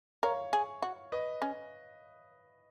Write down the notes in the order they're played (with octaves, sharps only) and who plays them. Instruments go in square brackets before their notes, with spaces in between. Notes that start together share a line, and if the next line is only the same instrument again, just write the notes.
[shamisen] A#4 [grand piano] C#5 F5
[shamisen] G#4
F#4
[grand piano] B4 D#5
[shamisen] C#4